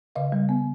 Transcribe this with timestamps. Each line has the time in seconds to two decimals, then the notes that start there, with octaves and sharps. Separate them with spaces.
0.16 C#3 D#5 F5
0.32 G3
0.49 B3